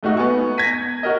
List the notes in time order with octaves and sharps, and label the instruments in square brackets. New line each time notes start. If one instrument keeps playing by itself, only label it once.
[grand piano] G#2 A3 D#4 F#4
B3 G#5 C#6
G#6 A#6 B6 D#7
F#4 A#4 D#5